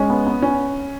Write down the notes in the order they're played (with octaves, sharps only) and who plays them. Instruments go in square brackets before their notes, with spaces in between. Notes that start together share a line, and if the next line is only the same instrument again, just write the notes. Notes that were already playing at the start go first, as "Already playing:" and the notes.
Already playing: [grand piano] G#3 [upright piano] C#4
[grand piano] B3
B3
[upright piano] C#4